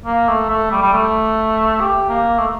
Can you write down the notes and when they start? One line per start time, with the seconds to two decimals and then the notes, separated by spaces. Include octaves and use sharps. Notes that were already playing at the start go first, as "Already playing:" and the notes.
0.06 A#3
0.28 A3
0.49 A3
0.71 G3
0.82 G3
0.93 A3
1.81 G4
2.09 A#3
2.39 A3